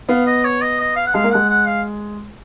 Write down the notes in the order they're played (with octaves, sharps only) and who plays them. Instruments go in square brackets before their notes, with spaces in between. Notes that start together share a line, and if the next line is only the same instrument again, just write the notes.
[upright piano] B3 [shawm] F5
[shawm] D#5
C#5
D#5
D#5
F5
F#5
[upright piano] G#3 [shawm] F5
[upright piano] A#3
[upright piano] G#3 [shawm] F#5
[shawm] F#5
F5